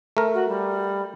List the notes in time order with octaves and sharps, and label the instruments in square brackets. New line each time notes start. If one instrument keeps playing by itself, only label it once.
[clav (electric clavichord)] A3 A#4
[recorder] F#4
G3